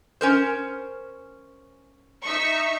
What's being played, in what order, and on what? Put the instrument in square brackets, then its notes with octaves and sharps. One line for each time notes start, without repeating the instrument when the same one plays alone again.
[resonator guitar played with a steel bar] C#4 A#4 C5
[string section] D#4 E5 C#6